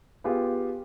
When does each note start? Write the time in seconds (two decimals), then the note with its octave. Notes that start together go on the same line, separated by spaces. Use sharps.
0.24 B3 F4 G4 G#4